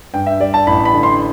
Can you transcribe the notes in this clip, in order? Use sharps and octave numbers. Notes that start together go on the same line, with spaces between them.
G2 G5
E5
G3 D5
A5
A1 B5
B5
D3
C6